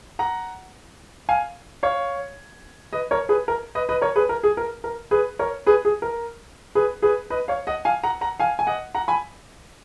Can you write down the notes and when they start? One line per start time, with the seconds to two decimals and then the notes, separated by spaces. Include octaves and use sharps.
0.19 F#5 A#5
1.29 F5 G#5
1.83 C#5 F5
2.93 B4 D#5
3.11 A#4 C#5
3.29 G#4 B4
3.48 A#4
3.75 B4 D#5
3.89 B4 D#5
4.01 A#4 C#5
4.16 G#4 B4
4.29 A#4
4.43 G#4
4.57 A#4
4.84 A#4
5.11 G#4 B4
5.39 A#4 C#5
5.66 G#4 B4
5.85 G#4
6.02 A#4
6.75 G#4 B4
7.02 G#4 B4
7.30 B4 D#5
7.48 C#5 F5
7.67 D#5 F#5
7.85 F5 G#5
8.04 F#5 A#5
8.21 F#5 A#5
8.40 F5 G#5
8.59 G#5
8.67 D#5 F#5
8.95 F#5 A#5
9.08 G#5 B5